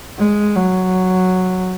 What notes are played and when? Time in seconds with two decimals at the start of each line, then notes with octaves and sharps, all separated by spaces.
0.18 G#3
0.56 F#3